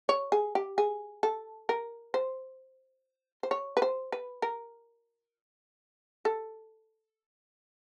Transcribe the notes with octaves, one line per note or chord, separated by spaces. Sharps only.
C#5
G#4
G4
G#4
A4
A#4
C5
C5
C#5
B4
C5
B4
A#4
A4